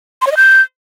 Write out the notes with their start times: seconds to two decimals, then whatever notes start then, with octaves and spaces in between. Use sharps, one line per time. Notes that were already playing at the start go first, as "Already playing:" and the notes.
0.22 C6
0.27 C#5
0.32 D#5
0.37 G6